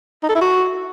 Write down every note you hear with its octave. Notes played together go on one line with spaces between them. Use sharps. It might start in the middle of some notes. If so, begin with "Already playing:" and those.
D#4
A4
E4
F#4